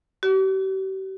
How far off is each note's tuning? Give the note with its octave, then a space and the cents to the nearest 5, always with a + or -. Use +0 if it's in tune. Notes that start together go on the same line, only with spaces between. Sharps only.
G4 -40